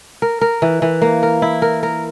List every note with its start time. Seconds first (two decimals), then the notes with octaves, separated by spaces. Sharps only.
0.22 A#4
0.41 A#4
0.62 E3
0.82 E3
1.02 A#3
1.23 A#4
1.42 E4
1.62 A#4
1.83 A#4